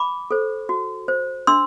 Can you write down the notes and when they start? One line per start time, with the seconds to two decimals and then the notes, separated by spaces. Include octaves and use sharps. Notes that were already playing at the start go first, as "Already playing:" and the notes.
Already playing: B5 D6
0.31 A4 C5
0.69 F#4
1.08 C5
1.47 D4 C6 E6